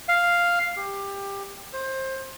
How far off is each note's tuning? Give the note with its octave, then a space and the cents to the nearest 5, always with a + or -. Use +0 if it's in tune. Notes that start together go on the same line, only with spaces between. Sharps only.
F5 +0
G4 +15
C5 +20